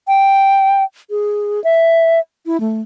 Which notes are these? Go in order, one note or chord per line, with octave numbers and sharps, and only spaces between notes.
G5
G#4
E5
E4
A3